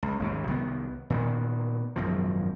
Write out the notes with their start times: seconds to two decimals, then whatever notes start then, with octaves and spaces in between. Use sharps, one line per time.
0.03 C#2
0.20 G#1 D#2 C#3
0.48 C2 D#3 F#3 B3
1.10 A#2 D#3 B3
1.96 G#1 F#2 B2 F3